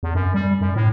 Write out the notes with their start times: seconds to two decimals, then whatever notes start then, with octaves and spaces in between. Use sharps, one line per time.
0.03 E2
0.15 F#2
0.34 G3
0.61 F#2
0.76 A2